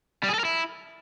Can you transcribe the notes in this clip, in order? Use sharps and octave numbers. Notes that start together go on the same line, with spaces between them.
G3
G#4
A4
A#4
E4